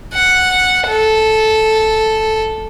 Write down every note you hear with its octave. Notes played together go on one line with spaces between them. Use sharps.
F#5
A4